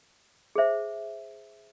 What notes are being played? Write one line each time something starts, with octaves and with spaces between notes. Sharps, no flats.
G#4 C5 E5